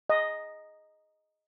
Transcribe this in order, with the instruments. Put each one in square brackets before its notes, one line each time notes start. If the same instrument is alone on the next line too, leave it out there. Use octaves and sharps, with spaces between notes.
[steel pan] D#5